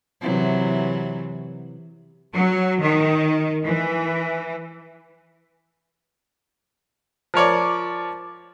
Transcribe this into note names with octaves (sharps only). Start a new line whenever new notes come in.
C3 E3 F#3
F#3
D#3
E3
F3 A#4 C#5 D5